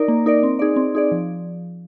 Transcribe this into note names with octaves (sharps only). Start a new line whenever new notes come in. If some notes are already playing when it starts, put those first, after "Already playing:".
Already playing: D#4 A#4 D5
A#3
D#4 A#4 D5
C4
D#4 G#4 D5
C4
D#4 G#4 D5
F3